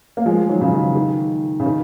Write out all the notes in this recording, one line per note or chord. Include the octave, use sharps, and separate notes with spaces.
A#3
F3 G#3
D#3 F#3
C#3 F3
D#3
D#3
C#3
D#3